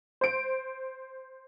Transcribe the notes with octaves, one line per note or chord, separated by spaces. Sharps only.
C5 D7